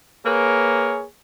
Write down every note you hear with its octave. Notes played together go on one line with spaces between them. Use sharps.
A#3 G#4 A#4 B4 C#5